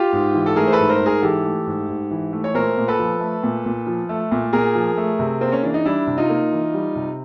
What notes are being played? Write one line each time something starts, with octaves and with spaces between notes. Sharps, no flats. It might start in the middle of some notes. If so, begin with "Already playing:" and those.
Already playing: F4 G4
G#2
E3
A4
A3 G#4 A#4
C5
A4 B4
G#2
A#4 C5
G#2
G#4 A#4
E3 G4 A4
A3
G#2
G#2
E3
A3
C#5
A#2 A#4 C5
A#2
A4 B4
F3
A3
A#2
A#2
F3
A3
A#2
A#2 G#4 A#4
F3
A3
C3
A#3 C4
C#4
E3 D4
D#4
G3 D4 E4
C3
D#4 F4
A#3
E3
G3
C3